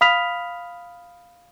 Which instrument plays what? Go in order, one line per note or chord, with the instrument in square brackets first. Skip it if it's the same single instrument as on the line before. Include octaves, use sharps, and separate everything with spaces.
[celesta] F5 B5 D#6 F6 B6 F7